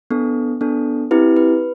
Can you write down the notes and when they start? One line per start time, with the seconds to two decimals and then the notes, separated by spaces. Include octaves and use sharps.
0.11 B3 D4 A4
0.61 B3 D4 A4
1.11 C4 E4 G4 B4
1.36 B4